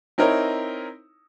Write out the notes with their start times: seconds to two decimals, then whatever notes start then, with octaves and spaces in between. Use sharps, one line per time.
0.18 C4 D#4 E4 A#4 C#5